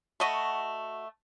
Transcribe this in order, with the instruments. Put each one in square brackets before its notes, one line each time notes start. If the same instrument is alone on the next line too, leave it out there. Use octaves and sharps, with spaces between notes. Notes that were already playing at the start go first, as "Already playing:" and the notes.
[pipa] A3 D#5 [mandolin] F#4 B5